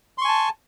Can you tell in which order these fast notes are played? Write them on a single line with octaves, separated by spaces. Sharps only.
C6 C#6 G#5 A5